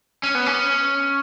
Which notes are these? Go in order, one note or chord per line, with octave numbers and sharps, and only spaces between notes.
C#4
B3
C#4